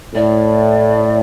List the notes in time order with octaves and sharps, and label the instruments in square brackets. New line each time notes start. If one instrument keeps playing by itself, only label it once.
[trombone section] A2 [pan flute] D5